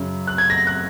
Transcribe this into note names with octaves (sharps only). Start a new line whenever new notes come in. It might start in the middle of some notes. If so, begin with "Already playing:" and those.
Already playing: F#2 C#3
F#6
G#6
A#6
F#6